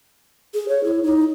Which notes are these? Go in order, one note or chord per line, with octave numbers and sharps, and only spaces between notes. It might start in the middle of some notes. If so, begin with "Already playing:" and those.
G#4
C#5
E4
D#4